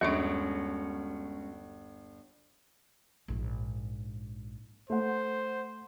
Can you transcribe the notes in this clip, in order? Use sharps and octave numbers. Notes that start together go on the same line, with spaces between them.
G1 D#2 G#3 C#4 D4 F#4 C#6 D7
A#1 G#2
A3 C5 F#5